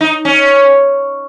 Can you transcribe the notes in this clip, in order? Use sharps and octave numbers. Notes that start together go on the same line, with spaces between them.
D#4
C#4